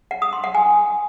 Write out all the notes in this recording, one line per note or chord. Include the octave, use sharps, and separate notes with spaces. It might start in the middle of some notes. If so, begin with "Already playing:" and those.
F#5
D#6
C6
F#5
G#5